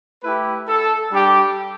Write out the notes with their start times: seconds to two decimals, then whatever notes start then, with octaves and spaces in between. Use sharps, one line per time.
0.23 A3 E4 G4 B4
0.67 A4
1.11 G3 D4 G4